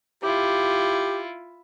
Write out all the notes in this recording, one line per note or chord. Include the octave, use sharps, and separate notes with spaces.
E4 F4 G4